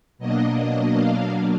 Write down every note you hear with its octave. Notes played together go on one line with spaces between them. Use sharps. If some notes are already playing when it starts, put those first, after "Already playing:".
B2 F#3 A#3 D4 D#5
F5